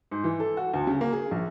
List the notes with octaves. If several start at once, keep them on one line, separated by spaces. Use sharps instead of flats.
G#2
E3
A4
F#4
D2
C#3
A#3
G#4
A#1